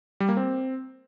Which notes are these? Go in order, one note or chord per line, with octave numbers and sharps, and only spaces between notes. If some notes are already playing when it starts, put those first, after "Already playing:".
G3
A#3
C4